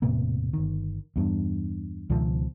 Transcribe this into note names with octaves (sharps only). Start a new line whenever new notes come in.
E1 A2 C3 A#3
G1 D#3
E2 G2
C#2 B2 D#3 F3